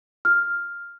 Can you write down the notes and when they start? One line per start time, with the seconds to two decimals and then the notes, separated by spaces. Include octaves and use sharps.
0.25 F6